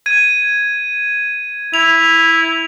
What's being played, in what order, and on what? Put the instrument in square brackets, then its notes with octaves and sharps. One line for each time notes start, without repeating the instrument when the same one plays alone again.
[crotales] G#6 D#7
[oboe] E4 [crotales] F7